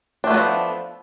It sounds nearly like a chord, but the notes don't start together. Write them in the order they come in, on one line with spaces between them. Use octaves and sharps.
D4 A3 B3 F#3 F3